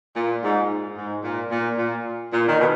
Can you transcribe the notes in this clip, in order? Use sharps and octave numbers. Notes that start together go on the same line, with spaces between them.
A#2
G#2
G#2
A#2
A#2
A#2
A#2
D#3
B2